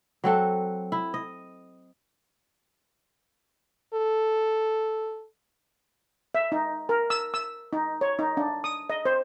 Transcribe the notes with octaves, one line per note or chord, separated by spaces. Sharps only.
F#3 C4 A4 F#5
E4
D#5
A4
E5
D#4
A#4
E6
E6
D#4
C#5
D#4
D4
D#6
D#5
C5